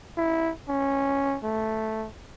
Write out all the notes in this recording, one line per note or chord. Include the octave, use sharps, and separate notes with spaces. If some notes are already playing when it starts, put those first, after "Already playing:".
E4
C#4
A3